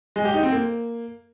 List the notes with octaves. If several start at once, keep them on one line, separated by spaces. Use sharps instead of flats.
G#3
G4
D#4
C4
A#3